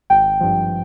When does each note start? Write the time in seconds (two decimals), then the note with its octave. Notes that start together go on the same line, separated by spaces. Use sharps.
0.10 G#1 G5
0.40 G2 F3